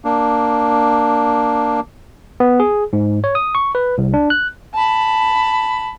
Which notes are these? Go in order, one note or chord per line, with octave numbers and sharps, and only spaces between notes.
A#3 D4
B3
G#4
G#2
C#5
D#6
C#6
B4
C2
D4
F#6
A5 B5